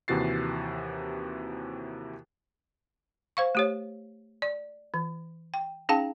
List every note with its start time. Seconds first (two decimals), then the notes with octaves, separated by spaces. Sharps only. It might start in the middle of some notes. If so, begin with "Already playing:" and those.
0.08 D#2 C3 E3 F#4 A6 C7
3.37 C5 F5 C#6
3.55 A3 G4 C#5
4.42 D5
4.94 E3
5.54 G5
5.89 C#4 D#4 G#4 F5 G5 A5